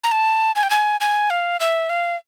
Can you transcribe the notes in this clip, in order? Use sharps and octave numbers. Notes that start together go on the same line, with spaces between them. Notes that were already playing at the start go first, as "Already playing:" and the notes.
A#5
A5
G#5
G5
G#5
G#5
F5
E5
F5